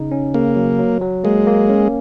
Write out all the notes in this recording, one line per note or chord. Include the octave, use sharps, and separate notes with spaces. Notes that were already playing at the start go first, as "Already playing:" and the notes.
Already playing: C#3 D#4
C#4
C#3 A#3
F#3
F#3
F#3
G#3 A#3
A#3
C#4